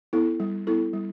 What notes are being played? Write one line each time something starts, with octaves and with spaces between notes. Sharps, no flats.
B3 E4 A4
G3
B3 E4 A4
G3